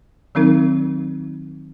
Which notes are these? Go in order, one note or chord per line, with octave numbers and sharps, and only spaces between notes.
D#3 F#3 C4 D#4 A#4